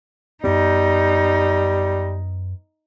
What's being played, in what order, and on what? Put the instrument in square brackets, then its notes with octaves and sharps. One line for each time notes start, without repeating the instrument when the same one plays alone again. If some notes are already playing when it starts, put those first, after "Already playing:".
[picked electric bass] F#2 B3 [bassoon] G3 [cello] D#4